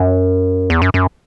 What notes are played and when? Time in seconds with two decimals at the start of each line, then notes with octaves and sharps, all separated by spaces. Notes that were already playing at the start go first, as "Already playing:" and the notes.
Already playing: F#2
0.70 E2
0.82 F#2
0.94 F#2